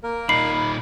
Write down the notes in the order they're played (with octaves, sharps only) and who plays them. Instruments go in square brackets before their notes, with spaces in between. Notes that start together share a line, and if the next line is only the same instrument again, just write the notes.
[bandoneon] A#3 A#4
[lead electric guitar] A#2 D#4 [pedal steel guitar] B5 [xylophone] C7